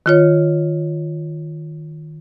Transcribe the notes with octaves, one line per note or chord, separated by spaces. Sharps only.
D#3 F4 C#5